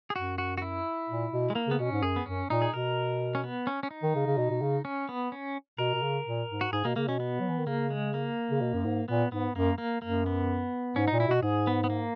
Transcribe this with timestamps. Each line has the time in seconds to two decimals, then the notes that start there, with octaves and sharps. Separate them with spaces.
0.10 G#4
0.16 F#2 F#4
0.38 F#4
0.58 F#4
0.62 E4
1.10 A#2
1.32 B2
1.50 G#3
1.55 A#3
1.67 C#3
1.71 B3
1.79 B2 C#4
1.92 G#2
2.03 F#2 G#4
2.16 B3
2.26 F#2 C#4
2.50 A#2 D#4
2.62 G#4
2.74 B2 A#4
3.35 C#4
3.44 B3
3.67 C#4
3.83 C#4
3.91 D#4
4.03 D#3
4.15 C#3
4.26 C#3
4.37 B2
4.50 B2
4.61 C#3
4.85 C#4
5.09 B3
5.32 C#4
5.78 B2 A#4
5.94 B2
6.02 C#3
6.26 A#2
6.50 G#2
6.61 F#4
6.73 G#2 G#4
6.84 B2 A#3
6.96 C#3 A#3
7.08 B2 C#4
7.20 B3
7.40 F#3
7.48 E3
7.58 D#3
7.67 C#3 A#3
7.90 G#3
8.14 A#3
8.51 C#3
8.61 B2
8.73 F#2
8.85 G#2
9.08 A#2 B3
9.32 G#2 B3
9.55 F#2 A#3
9.78 A#3
10.02 F#2 A#3
10.26 B3
10.96 G#2 C#4
11.08 A#2 D#4
11.20 E4
11.28 B2 F#4
11.43 G#2 G#4
11.67 B3
11.84 B3
11.90 A#3